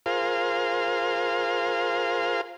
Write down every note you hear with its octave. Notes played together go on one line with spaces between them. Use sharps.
F4 G#4 A#4 C5 F5